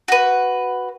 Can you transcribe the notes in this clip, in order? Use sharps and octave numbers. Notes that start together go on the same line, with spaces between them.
F#4 B4